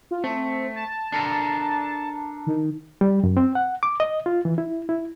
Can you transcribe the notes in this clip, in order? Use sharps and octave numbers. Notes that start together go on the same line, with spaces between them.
F4
A3 C4
A5
D4 A4 A#4
D#3
G3
F#2
C4
F#5
D6
D#5
F4
E3
E4
E4